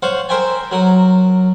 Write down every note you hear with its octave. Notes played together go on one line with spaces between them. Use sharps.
C5 C#5 F5 F#5
A#4 C5 E5 G5 G#5
F#3 A#4